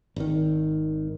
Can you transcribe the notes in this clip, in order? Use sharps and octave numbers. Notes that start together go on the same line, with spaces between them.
G#1 D#3